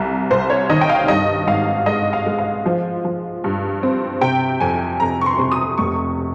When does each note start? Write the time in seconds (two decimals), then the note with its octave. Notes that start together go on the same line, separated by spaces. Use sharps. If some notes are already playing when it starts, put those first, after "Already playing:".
Already playing: C2 C3
0.30 C2 C5
0.50 C#5
0.70 D#3 D#5
0.81 G5
0.89 F5
1.08 G2 D#5
1.47 G#1 F5
1.86 G#3 D#5
2.13 F5
2.26 G#3
2.38 F5
2.66 F3
3.04 F3
3.44 G2
3.83 C4
4.21 C3 G5
4.60 F2 G#5
5.00 F2 A#5
5.21 C#6
5.26 C6
5.39 C3
5.52 D#6
5.78 F1 C#6